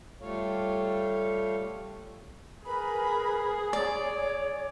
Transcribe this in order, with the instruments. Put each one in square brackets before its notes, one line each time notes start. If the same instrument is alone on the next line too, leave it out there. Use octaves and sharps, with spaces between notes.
[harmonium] G3 A3 F4 A4 C#5 F5
[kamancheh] G#4 [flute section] A#4 B4 B5
[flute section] C#5 [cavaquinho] D5